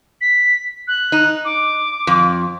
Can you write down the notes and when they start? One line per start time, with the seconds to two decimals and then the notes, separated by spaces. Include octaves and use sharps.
0.21 B6
0.88 F#6
1.12 D#4
1.45 D6
2.07 F2